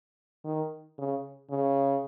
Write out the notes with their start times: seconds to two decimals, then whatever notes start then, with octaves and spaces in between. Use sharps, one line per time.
0.45 D#3
0.98 C#3
1.51 C#3